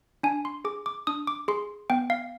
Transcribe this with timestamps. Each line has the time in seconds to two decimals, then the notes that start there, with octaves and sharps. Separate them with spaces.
0.23 D4 G#5
0.45 C6
0.65 G#4 D6
0.86 D6
1.07 D4 D#6
1.27 D6
1.48 G#4 C6
1.90 B3 G5
2.10 F5